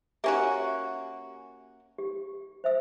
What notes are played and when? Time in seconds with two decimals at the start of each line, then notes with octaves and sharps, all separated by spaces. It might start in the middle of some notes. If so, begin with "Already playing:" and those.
0.24 A#3 C#4 F#4 G4 E5
1.98 G4
2.64 C5 E5 E6